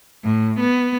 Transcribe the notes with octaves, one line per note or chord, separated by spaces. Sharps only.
A2
B3